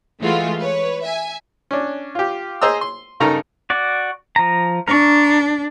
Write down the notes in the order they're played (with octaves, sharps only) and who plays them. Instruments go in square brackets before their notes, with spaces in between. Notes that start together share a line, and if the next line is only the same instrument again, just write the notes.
[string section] E3 G#3 A3 F4 F#4
B4 C#5
E5 G#5
[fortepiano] C#4 D4
F4 G4
G#4 C5 D#5 A#5 E6
C6
G2 C#3 D#4 A4 A#4 A#5
[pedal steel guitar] F#4 D5
F3 A#5
[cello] D4 [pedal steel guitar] A#4 C#6